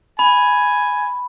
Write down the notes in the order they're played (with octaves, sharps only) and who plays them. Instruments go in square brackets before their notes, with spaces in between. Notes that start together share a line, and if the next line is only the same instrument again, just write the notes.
[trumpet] G#5 [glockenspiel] B5